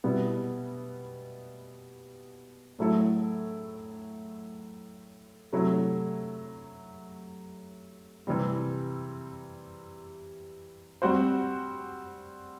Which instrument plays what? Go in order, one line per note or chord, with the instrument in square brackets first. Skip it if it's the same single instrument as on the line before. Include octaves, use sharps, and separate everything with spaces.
[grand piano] B2 G3 B3 E4
A2 F#3 A3 E4 A4
C3 F#3 A3 E4
C3 E3 G3 C4
G3 C4 F#4 C5